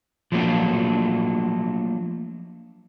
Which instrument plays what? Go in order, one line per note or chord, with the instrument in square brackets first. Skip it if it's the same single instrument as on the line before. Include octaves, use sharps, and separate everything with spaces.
[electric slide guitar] F3 F#3 A3 A#3 D4